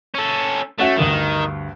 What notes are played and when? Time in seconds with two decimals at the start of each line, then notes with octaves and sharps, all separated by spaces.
0.15 C#4 A4
0.79 A3 C#4 F#4 E5
0.98 D2 G2 D#3